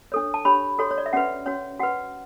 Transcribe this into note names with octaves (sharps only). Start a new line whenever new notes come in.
D4 A4 C#5
A5
D4 G4 C#5 B5
F#4 A4 C#5
C#5
D5
E5
C#4 F#4 B4 F#5
C#4 F#4 C#5
F#4 B4 F#5